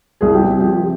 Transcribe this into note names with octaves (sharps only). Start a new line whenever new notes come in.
C2 G#4
G4
C3
F3 G4